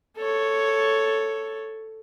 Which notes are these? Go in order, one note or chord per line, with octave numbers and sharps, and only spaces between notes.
A4 C#5